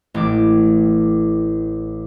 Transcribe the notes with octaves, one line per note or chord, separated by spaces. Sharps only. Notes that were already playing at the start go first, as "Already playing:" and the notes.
A1 A2 D6